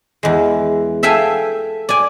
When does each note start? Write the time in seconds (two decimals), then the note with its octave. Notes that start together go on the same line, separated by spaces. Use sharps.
0.23 E2 G#3
1.03 A4 E5 F5 G5 G#5
1.89 D5 G#5